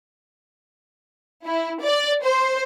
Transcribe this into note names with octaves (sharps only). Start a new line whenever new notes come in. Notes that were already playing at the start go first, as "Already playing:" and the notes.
E4
D5
C5